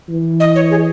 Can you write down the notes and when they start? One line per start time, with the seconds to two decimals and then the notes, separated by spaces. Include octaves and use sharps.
0.09 E3
0.40 D#5
0.55 C#5
0.70 G#4